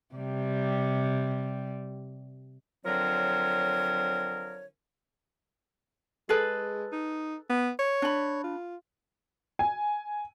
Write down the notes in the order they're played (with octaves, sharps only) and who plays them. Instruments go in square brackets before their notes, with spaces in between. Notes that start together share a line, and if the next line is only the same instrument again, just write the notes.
[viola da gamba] C3 G3
[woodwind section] D3 F3 F#3 C4 A#4 C#5
[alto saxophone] G#3 [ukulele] G#4 A4 B4
[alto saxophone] D#4
B3
C#5
[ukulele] D4 B5
[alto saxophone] F4
[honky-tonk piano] G#5